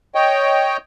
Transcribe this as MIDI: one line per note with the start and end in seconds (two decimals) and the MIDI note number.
0.15 0.77 73
0.15 0.77 75
0.15 0.77 79